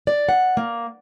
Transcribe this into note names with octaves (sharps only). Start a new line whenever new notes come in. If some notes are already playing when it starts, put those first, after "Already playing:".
D5
F#5
A#3